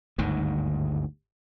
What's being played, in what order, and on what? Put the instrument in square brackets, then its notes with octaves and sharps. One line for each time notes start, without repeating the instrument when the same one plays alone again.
[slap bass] G1 D2 G#2 D#3